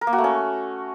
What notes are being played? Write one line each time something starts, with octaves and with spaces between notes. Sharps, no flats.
A#4
A#3
F#4
A3
C#4